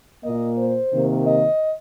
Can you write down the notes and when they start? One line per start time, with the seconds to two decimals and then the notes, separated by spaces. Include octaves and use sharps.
0.24 A#2 A#3 D#5
0.58 C5
0.93 C3 D#3 A#3
1.26 D#5